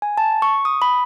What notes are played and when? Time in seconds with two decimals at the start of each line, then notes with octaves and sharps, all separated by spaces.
0.02 G#5
0.17 A5
0.42 C#6
0.65 D#6
0.82 B5